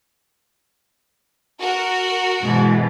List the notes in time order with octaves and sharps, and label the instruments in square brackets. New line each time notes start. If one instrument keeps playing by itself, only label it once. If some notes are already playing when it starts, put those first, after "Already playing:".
[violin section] F#4 A#4
[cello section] G#2 B2 E3